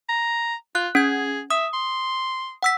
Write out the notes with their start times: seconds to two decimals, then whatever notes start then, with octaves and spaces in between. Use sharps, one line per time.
0.09 A#5
0.75 F4 F#6
0.95 C#4 G#4 G#6
1.51 E5 D#6
1.74 C6
2.63 F#5 E6 B6